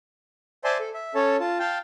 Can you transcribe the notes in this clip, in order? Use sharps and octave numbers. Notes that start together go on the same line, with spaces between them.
C5 D5 E5 G#5 A5 C6
A4
E5
C#4 A4 C#5 A5
F4 A5
F5 G5 A5